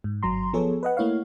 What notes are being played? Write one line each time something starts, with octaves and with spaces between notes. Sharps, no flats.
G#2
G1 F#3 A#5 C6
F3 B3 G#4 A4 C#5
B4 D#5 F#5
A3 A#3 E4 C#5 F5